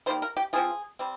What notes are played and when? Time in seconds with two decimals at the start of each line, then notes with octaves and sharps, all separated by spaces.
0.06 D#3 G3 A#3 C5
0.22 A#4
0.37 G4
0.53 F3 C4 F4 G#4
0.99 G3 C4